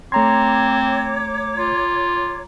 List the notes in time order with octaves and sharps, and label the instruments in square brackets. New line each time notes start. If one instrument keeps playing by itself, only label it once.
[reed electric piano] A3 C6 [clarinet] C4 [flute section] C#5 D6 [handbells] A#5 G#6
[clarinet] F4